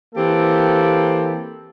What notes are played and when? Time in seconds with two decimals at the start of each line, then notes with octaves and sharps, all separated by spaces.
0.15 E3 A#3 C4 G4 A4